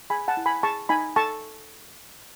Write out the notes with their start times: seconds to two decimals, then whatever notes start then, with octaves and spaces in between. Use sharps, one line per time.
0.10 G#4 G#5 B5
0.28 F#5 A5
0.37 E4
0.46 G#5 B5
0.63 G#4 A5 C#6
0.89 D#4 G#5 B5
1.16 A4 A5 C#6